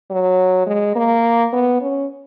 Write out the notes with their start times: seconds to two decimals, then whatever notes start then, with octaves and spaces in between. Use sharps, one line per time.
0.11 F#3
0.67 G#3
0.95 A#3
1.53 B3
1.81 C#4